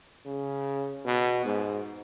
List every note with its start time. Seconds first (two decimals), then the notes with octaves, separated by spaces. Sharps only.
0.25 C#3
1.05 B2
1.45 G#2